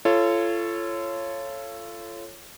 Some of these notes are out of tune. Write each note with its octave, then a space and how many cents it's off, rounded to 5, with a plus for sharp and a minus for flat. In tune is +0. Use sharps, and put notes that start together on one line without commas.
F4 -30 A4 +0 C#5 -10